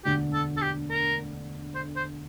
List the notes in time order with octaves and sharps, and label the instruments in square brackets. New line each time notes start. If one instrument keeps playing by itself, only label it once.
[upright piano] E1 D2 D3 [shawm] G4
[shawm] A4
A4
G4
A#4
C5
C5